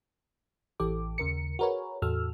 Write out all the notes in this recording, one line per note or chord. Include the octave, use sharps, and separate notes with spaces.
A1 E3 G4 A4 D6
D#2 C#3 A#4 C#7
F#4 G#4 A#4 B4 C#5
E2 A2 F#4 A4 E6 F6